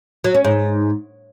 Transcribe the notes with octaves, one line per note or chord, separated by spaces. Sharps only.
F#3
C#4
G#2